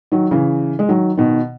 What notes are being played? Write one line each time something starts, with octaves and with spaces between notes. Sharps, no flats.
D#3 F#3
C#3 E3
G#3
D#3 F#3
B2 D#3